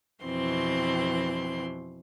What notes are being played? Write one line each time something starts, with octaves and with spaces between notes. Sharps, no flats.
F2 B2 E3 C4 C6